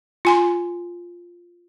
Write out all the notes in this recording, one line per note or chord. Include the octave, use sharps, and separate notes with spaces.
F4 G#5 C6